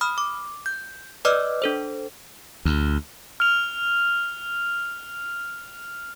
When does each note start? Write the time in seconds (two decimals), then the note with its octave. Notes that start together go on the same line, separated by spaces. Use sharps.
0.01 B5 D#6 F6
0.18 D6
0.66 G6
1.25 B4 D5 D#5 D6 E6 F6
1.62 D4 A4 C5
2.65 D2
3.40 F6 F7